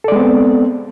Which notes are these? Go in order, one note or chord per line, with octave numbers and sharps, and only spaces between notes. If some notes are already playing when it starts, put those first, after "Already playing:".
G#3 B3 C4 A4 D5